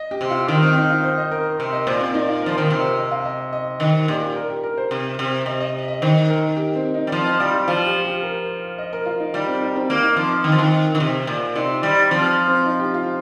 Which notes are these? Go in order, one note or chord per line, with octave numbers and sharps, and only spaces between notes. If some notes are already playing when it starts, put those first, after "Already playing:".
Already playing: D#5
G4
C3
F4
D#3 D#4
C4
D#4
F4
C5
D#5
A#4
C3 A#4
D#5
A#2 C5
C4
D#4
F4
F3 A#4
D#3 C5
C3 A#4
C5
D#5
F5
D#5
D#5
D#3 D#5
A#2 G4
G4
A#4
G4
A#4
C5
C3
C3
C3 D#5
D#5
D#5
D#3 C5
A#4
G4
C4
D#4
G3
F3 C4
D#4
G3 F4
F4
F3 F4
G4
G4
A#4
D#5
A#4
F4
D#4
G3 F4
C4
D#4
C4
A#3
D#4
F3 C4
D#4
D#3
F3
D#3
D#3
C3
A#2
C3 D#4
G3 D#4
F3 C4
C4
D#4
G4
F4